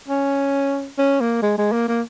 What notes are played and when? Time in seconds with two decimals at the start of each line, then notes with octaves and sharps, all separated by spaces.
0.08 C#4
0.98 C#4
1.21 A#3
1.42 G#3
1.58 G#3
1.72 A#3
1.88 A#3